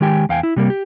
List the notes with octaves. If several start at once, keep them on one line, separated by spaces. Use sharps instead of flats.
D#3 G#3 G4 G5 G#5
E2 F5 G5 G#5
E4
C3 G3 A#3
G4